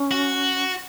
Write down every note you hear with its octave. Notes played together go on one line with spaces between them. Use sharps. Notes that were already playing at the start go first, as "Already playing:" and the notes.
Already playing: C#4
F#4